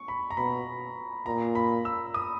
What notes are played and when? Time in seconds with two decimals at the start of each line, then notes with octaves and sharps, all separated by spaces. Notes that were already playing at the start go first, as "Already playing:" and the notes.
Already playing: C#6
0.08 B5
0.31 A#5
0.37 B2 B5
1.26 A#2 A#5
1.55 B5
1.85 E6
2.14 D#6